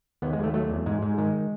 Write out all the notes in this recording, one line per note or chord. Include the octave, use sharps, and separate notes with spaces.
D#2 B3
G#3
D#2
A3
F#3 A3
E2
G#2 G#3
G#2 G#3
D#3 G#3